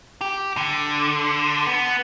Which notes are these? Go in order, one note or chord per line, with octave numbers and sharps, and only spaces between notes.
G4
D3
B3